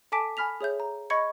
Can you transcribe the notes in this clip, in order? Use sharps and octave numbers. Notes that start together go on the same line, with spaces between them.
A4 G#5 A5 D6 B6 D7
G#5 B5 F6 B6 F7
G#4 C#5 E5 G6
A#5
D#5 B5 C#6 G#6 C#7